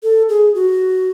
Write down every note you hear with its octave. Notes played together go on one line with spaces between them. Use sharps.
A4
G#4
F#4